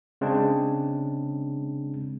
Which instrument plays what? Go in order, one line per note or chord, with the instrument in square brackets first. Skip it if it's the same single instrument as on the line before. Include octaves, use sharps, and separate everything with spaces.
[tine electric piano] C#3 G#3 C4 D4